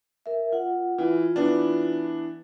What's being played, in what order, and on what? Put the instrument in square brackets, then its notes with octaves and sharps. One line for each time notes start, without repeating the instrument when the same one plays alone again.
[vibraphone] A#4 E5
F4 F#5
[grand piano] E3 [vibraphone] F4
[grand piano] E3 B3 D4